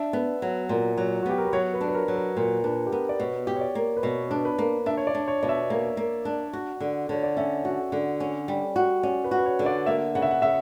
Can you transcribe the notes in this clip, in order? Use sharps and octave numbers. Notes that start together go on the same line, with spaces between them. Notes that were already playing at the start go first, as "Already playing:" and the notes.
Already playing: D4 E5
B3
F#3
A#2
F#3
F#4
B3 G4
A#4
B4
F#3 C#5
B4
D4
B4
A#4
F#3
A#4
A#2 A#4
D4 B4
G4
B3 A#4
D5
B2 C#5
G4
C#5
D5
A#3
B4
B2 C#5
D4
B4
A#3
D4 E5
C#5
D5
D4
C#5
B2 D5
E5
A#3
A#3
D4
F#4
D3
D3 C#5
D5
C#4 E5
F#4
D3
C#4
G3
F#4
C#4 D5
B4
F#4
B4
C#5
D3
D5
A#3 E5
C#3 F#5
E5
F#5
C#3 E5